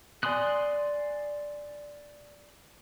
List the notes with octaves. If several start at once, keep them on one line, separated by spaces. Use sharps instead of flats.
D5 G#5 C6 D#6 F#6